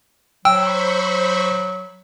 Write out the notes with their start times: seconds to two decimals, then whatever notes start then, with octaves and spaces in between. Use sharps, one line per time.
0.45 F#3 C5 G5 B5 C#6 E6